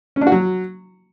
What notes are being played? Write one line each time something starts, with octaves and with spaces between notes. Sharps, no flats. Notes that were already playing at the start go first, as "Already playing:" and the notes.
C#4
D4
F#4
F#3